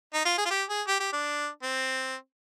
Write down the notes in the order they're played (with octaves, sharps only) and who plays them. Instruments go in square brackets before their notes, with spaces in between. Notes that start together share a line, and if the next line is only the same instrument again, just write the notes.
[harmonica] D#4
F4
G#4
F4
G4
G#4
G4
G4
D4
C4